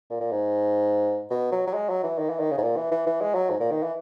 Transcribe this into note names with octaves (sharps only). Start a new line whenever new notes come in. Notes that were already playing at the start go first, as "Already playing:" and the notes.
A#2
A#2
G#2
B2
F#3
F#3
G#3
F#3
E3
D#3
E3
D#3
C#3
G#2
A#2
E3
E3
E3
G#3
F#3
G#2
A#2
D#3
E3